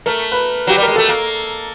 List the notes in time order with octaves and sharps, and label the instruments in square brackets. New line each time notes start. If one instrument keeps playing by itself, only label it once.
[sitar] A3 [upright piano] A#4
[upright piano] B4
[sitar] F#3 [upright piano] G4
[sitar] G3
[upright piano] A#4
[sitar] G#3
[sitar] A3 [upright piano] A4
[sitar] A#3